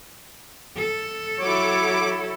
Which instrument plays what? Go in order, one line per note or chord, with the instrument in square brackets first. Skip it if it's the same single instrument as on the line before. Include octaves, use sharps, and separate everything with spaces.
[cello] A4
[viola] F#3 E4 [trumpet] C#5 [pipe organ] D6